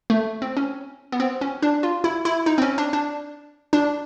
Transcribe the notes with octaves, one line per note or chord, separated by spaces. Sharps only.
A3
C4
C#4
B3
C4
C#4
D4
F4
E4
E4
D#4
C4
C#4
D4
D4
D4